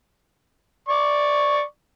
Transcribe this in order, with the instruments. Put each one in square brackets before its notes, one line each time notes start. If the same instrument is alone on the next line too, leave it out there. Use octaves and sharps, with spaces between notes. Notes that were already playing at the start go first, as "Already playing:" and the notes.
[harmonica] D5 C#6 D6